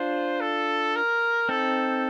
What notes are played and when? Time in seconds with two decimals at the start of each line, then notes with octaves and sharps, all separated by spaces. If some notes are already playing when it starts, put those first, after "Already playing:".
Already playing: D4 F4 C5
0.41 A4
0.96 A#4
1.49 C4 D#4 A4